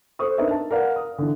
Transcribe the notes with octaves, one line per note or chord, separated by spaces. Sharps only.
A4 C5 C#6 D#6
D4 D#4 A#4 B4 D5 E5
A5
A#4 B4 D5 F5 F#5
D#6
D3 E3